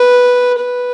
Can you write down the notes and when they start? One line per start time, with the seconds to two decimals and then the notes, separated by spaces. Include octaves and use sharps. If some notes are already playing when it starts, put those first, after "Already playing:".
Already playing: B4
0.59 B4